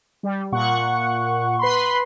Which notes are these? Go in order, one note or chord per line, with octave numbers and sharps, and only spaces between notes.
G3
A#2 F#5 C#6
B4 B5 C6